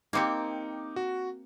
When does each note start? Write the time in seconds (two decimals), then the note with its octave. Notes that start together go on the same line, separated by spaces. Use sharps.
0.13 A#3 C4 D#4 G4 D6 C#7
0.96 F#4